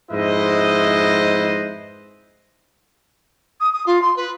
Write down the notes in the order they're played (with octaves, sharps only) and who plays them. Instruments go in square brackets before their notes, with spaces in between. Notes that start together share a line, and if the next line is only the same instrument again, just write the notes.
[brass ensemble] F2 G#2 E4 B4 C5 D#5
[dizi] D#6
D#6
F4
C6
B4